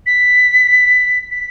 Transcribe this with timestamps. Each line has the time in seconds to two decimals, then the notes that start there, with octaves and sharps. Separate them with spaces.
0.06 B6
1.31 B6